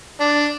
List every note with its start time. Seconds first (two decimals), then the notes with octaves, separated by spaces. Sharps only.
0.20 D4